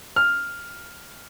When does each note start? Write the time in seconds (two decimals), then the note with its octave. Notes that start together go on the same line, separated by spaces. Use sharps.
0.16 F6